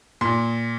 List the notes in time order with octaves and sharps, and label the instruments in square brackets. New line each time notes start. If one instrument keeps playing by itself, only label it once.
[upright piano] A#2 C6